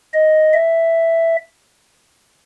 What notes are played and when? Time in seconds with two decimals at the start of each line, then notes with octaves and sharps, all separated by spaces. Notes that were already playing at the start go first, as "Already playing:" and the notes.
0.14 D#5
0.54 E5